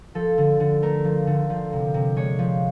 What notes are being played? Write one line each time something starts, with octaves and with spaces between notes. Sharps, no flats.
F3 A4
D3
D3
A3 A#4
F3
D3
F3
C3
C3
G#3 C#5
F3